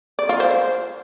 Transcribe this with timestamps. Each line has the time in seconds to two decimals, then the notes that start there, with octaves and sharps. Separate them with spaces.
0.19 D5
0.29 F4
0.40 C5
0.51 C5